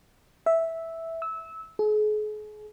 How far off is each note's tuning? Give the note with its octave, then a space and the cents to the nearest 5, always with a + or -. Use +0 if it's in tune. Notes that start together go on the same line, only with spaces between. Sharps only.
E5 -5
E6 -20
G#4 +40